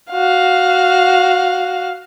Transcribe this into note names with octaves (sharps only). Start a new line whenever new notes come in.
F#4 F5